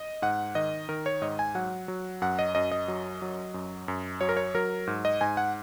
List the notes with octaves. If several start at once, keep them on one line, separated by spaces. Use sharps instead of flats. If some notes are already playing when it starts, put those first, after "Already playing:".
Already playing: D#5
G#2 F#5
D#3 D#5
D#3 A#4
C#5
G#2 D#5
G#5
F#3 F#5
F#3
F#2 F#5
D#5
F#2 D#5
D#5
F#3
F#3
F#2
F#2
F#3 C#5
A#4
C#5
F#3 A#4
G#2
D#5
G#2 G#5
F#5